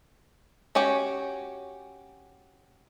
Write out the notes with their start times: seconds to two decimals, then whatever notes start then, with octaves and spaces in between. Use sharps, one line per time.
0.75 C#4 F#4 G4 C#5